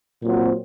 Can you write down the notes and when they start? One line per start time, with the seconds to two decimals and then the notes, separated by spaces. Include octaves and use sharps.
0.23 A#2 F#3 C4 F#4